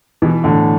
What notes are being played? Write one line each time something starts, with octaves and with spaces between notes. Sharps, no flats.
B2 E3
A2 D3